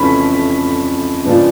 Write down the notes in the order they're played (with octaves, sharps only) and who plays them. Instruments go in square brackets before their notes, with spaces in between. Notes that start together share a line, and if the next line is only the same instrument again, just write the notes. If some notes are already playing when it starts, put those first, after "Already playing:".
Already playing: [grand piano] F2 C#3 E3 A3 C#4 [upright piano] B5
[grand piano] C#3 F3 G#3 B3 D4